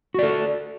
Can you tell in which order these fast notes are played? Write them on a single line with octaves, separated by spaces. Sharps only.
F#4 D5 A4